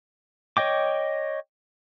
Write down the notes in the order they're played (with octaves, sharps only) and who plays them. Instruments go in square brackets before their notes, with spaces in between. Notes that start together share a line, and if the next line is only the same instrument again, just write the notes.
[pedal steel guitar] C#5 D#5 G5 D6